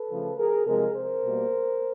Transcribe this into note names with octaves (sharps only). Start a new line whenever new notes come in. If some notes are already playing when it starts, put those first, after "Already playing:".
Already playing: A4 B4
C#3 F3 A3
G#4 A#4
C3 F3 G#3 G#4 A#4
A#4 C5
B2 G3 A#3